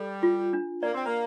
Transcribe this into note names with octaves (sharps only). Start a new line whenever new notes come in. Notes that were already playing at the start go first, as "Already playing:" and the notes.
Already playing: G3 A4
F4
D4
A#3 D5
C4
A#3